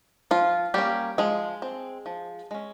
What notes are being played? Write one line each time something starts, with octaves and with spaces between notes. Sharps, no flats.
F3 F4
G3 A#3 C#4 G4
F3 G#3 G#4
C4
F3
G#3 C#4